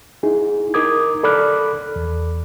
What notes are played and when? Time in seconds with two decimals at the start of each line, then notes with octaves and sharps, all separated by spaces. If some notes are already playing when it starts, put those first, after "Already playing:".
0.23 D#4 E4 G#4
0.74 D#4 A#4 D6 D#6 G#6
1.23 A4 D5 B5 D6 F6 F#6
1.96 E2